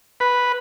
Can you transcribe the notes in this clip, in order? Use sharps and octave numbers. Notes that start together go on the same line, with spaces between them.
B4